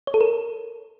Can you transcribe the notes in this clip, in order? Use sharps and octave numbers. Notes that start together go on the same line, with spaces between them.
C#5
A4
A#4